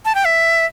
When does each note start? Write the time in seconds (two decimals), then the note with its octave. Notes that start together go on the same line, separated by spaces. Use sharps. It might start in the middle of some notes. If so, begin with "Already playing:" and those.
0.05 A5
0.15 G5
0.25 E5